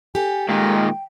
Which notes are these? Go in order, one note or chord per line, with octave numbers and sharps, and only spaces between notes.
G4 A4 G#5
A#2 D#3 G#3 G5